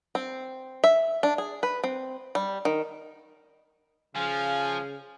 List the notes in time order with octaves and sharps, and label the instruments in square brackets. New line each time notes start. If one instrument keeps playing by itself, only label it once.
[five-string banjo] C4
E5
D4
G#4
B4
C4
G3
D#3
[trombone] C#3 [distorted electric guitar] F3 [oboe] F5 [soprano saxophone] G#5